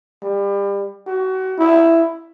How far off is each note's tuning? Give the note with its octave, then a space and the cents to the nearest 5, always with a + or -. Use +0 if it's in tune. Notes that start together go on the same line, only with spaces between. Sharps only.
G3 +30
F#4 +30
E4 +10